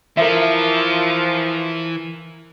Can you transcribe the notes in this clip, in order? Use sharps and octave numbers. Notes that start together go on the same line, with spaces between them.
E3 F3 A#4 E5